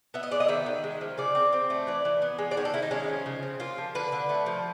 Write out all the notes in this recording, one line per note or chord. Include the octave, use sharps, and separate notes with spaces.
B3 E5
D#5
G#3 D5
D#5
D#3 E5
D#3
G#3
F3
C#3 D5
C4
C4
A3
E3 D5
E3
B3
G#3
D5
D#3 C#5
A4
D#3 E4
D#4
G#3 C#4
F3
C#3
C4
A#3 F4
F3
D3 B4
D3
A3
F3